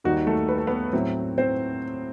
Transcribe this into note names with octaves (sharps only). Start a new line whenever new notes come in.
D#2 D#3 G3 D#4 F#4
A3 A4
B4
A4
B3 B4
A2 F#3 C4 E4
C4 C5